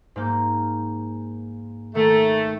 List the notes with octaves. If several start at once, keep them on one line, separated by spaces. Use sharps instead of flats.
G#2 A#3 G6
D#3 A3